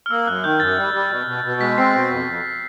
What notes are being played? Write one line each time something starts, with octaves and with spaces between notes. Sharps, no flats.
F6
A#3 E6
F#2 F#6
D#3 G6
F#2 A6
G3
G3
B2
B2
B2
G#3 B6
C4 C7
B2
F2
F2